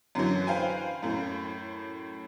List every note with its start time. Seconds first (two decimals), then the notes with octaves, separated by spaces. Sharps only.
0.15 F#2 D3 E3 F#3
0.47 B4 C5 F5 G5 G#5
1.02 F#2 A2